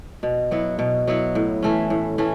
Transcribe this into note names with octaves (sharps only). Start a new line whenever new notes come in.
B2
F#3 B3 E4
B2
F#3 B3 E4
A2
E3 A3 C#4
A2
E3 A3 C#4